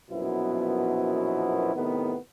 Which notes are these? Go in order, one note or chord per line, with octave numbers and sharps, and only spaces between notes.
A#1 F#2 B2 F3 B3 E4
A2 C3 D#3 B3